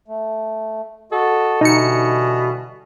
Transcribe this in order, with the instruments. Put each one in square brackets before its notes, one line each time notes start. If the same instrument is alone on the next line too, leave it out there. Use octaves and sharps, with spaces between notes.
[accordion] A3
[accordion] F#4 D#5 [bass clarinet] A4
[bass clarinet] B2 [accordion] D3 E3 G3 [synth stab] D#4 C#7